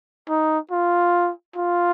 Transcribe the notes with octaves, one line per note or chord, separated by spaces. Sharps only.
D#4
F4
F4